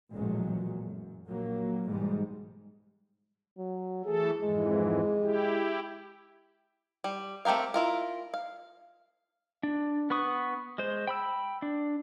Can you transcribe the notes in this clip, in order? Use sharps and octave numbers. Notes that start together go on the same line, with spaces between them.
A1 F#2 A#2 F3 F#3 G#3
F#2
A#1 F#3 A#3
B1 G#2 E3 G3 G#3
F#3
E3 A3 G#4 A4
F2 G#2 E3 G#3
E4 G4
G3
A3 C4 G4 A#4 F5
E4 F4 A#4
F5
D4
B3 B4 C#6 D#6
G#3 C5
G5 B5 E6
D4